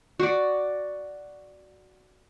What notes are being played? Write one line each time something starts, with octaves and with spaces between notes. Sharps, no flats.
F#4 D5